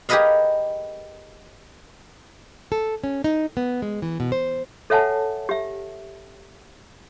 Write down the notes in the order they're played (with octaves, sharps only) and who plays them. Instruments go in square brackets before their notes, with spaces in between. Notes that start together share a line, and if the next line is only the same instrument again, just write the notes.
[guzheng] G4 G#4 A#4 B4 D#5 F5
[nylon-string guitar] A4
C#4
D#4
B3
G#3
E3
B2
C5
[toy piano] A4 C#5 E5 F#5 G#5 A5
G4 E5